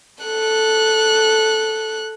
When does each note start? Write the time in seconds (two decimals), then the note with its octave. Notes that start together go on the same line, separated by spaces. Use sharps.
0.24 A4 F#6